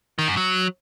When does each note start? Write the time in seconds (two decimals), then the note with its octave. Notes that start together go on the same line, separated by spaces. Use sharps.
0.19 D#3
0.28 F#2
0.37 F#3